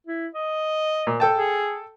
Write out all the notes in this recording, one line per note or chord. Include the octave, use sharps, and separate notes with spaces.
E4
D#5
A#2
A4 G5 A5
G#4